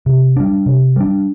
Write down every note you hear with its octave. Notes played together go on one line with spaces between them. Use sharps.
C3
G3 D4
C3
G3 D4